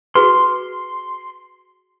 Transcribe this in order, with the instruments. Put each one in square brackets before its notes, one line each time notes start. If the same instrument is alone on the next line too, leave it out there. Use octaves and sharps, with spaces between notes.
[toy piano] F#4 G#4 B4 [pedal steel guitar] C6